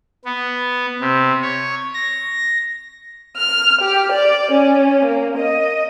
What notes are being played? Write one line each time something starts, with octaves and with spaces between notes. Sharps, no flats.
B3
C3
C#5
A#6
F6
G4
D5
C#4
A#3
D#5